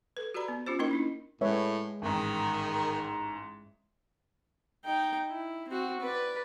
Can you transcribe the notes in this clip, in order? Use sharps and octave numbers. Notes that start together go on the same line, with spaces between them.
A4 B4
F#4 G4 B4 D5 A#5 B5
B3
C#4 F4 G4 C5
A#3 C#4 D#4 E4 A#4 D#5
C#4 D4 E4
A2 G#3 B4 C#5 E5
A1 G#2 D#3
D#4 G5
E4
C4 F#4
B4 D5